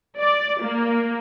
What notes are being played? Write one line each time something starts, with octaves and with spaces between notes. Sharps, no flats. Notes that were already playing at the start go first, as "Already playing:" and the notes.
D5
A#3